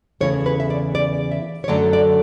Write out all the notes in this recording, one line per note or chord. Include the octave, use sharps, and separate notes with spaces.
E2 C#3 E3 A3 C#5
B4
E5
D5
D5
E5
C#5
F#2 D3 F#3 A3 D5
D5